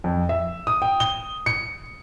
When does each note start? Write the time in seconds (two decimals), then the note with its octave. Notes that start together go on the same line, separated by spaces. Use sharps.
0.04 F2
0.29 E5
0.67 D#6
0.82 G5
1.00 G7
1.46 C#7